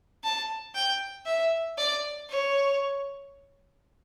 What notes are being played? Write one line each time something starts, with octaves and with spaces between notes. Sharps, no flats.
A5
G5
E5
D5
C#5